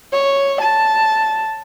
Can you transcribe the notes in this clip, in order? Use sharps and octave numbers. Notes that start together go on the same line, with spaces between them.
C#5
A5